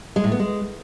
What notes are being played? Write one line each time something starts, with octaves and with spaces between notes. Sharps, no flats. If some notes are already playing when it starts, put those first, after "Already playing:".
G#3
A2
B3
G#3